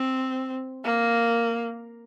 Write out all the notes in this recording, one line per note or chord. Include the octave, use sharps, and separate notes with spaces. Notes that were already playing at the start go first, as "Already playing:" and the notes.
Already playing: C4
A#3